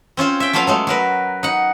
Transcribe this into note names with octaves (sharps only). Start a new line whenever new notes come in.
C4 C#4 F4 C5
E5 G5
F3 F#3 A3 B3 F4 F5
F#3 G#3 A3
F#3 A#4 B4
D#4 F#5